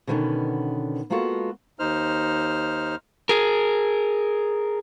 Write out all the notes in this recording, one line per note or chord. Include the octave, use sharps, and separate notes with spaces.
B2 D3 D#3 A#3 B3 C#4
G#3 A#3 B3 F4 F#4 A4
D#2 D#4 C5 F6
G#4 A#4